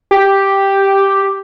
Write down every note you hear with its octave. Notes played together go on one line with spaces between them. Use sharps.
G4